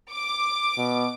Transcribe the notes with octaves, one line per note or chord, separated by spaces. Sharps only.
D6
B2